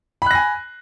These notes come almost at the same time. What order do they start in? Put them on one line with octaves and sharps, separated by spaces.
B5 F#6 A#6 G#5